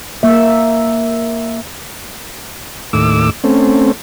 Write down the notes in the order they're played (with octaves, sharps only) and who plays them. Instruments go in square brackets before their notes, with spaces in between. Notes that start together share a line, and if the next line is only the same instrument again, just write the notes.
[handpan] A#3 E5
[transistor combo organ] D#2 A2 D6 E6
A3 C4 C#4